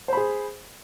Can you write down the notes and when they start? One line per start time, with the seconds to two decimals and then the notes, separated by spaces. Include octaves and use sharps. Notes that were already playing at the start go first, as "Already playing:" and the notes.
0.08 C5
0.13 B5
0.17 G#4